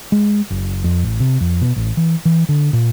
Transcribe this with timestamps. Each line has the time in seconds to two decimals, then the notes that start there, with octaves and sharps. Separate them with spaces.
0.12 G#3
0.50 F#1
0.84 F2
1.03 A1
1.20 C3
1.41 F2
1.61 B2
1.76 A1
1.97 E3
2.25 E3
2.49 D3
2.73 A#2